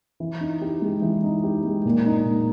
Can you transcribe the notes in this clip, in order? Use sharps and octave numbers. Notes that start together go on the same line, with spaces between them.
E3
D#4
G4
G#3
E3
D#4
G4
G#3
A#2
D#4
A#2